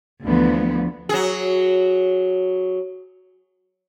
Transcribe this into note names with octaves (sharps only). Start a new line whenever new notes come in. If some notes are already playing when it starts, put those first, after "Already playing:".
D2 E3 F3 B3
F#3 G#4